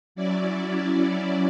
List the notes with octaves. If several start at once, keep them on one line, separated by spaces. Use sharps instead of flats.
F#3 C#4 E4 D5